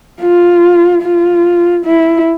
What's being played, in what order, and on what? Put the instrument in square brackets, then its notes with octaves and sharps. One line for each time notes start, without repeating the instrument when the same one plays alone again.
[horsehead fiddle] F4
F4
E4